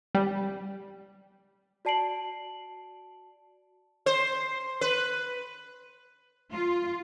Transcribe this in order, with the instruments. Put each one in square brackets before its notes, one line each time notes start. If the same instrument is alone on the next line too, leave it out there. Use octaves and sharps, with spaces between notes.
[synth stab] G3
[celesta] F#4 D5 A5 C7 D7 F#7
[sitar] C5
B4
[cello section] F4